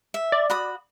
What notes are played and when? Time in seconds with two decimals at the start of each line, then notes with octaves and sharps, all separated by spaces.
0.14 E5
0.32 D5
0.50 F#4 B5 D#6